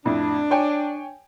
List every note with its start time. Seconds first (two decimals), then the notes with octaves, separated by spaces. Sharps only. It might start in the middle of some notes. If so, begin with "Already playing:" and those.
0.05 F2 A2 A3 D4
0.51 C#5 G5 G#5